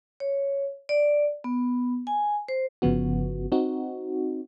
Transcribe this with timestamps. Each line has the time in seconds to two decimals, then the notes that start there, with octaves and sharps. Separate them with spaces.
0.20 C#5
0.89 D5
1.44 B3
2.07 G#5
2.49 C5
2.82 G1 C#3 F3 B3 F#4
3.52 C4 D#4 F#4